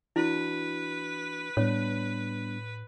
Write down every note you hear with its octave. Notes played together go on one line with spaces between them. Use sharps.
E3 D4 E4 F#4 B4
A2 G3 B3 D4 C#5